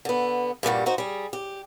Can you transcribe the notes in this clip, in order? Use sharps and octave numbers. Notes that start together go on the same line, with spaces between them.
D3 B3
G2 A#2 G3 F#4
D#4 F#4 C5
G3 G#4
G4